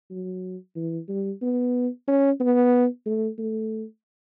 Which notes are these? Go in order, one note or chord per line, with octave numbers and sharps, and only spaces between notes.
F#3
E3
G3
B3
C#4
B3
A3
A3